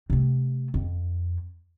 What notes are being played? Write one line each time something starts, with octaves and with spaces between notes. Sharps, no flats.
C3 A3
F2